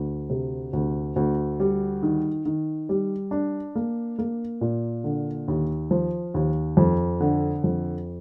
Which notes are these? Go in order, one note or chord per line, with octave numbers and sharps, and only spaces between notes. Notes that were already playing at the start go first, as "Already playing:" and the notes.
Already playing: D2
C3
D2
D2
G3
D#3
D#3
G3
D4
A#3
A#3
A#2
D3
D#2
F3
D#2
F2
D3
F2